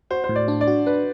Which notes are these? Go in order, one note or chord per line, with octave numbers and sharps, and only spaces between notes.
F#4 C5
C5
A2
D5
D4
D5
F#4
D4 B4